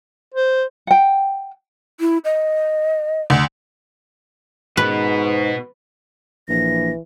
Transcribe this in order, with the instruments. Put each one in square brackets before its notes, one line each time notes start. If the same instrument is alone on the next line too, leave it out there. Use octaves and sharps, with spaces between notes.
[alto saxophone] C5
[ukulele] F#5 G5
[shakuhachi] E4
D#5
[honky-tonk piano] D2
[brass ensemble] G#2 [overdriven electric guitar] B2 B3 [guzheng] B4
[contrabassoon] A#1 [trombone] E3 [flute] A#6